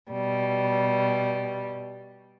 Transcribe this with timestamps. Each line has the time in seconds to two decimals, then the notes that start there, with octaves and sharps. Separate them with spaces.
0.11 B2 G3